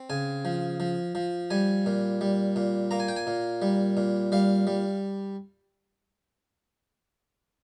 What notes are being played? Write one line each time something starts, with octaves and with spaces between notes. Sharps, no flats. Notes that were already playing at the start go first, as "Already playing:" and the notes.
Already playing: C4
C#3 G#5
F3
F3
F3
G3 G#5
A#2
G3
A#2
A#3 A#5
G#5
G5
G#5
A#2
G3
A#2
G3 F5
G3